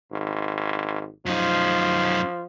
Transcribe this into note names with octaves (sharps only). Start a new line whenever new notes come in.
G#1
F#2 F3 D#4